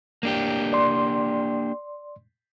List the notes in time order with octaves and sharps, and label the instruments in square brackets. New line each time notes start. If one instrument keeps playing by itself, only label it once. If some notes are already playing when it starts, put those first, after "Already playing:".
[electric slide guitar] A#3 D4 G4
[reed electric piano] D5 C6